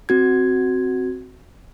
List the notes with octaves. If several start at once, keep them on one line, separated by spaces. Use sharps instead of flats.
C4 F#4 G#6